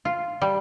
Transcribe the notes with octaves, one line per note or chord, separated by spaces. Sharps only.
F4
G3